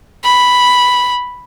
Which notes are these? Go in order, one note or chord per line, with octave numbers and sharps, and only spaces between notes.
B5